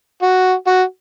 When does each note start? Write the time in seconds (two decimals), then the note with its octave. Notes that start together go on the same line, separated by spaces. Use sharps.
0.22 F#4
0.67 F#4